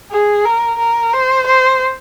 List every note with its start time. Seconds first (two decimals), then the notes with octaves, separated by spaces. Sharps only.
0.11 G#4
0.45 A#4
0.78 A#4
1.13 C5
1.47 C5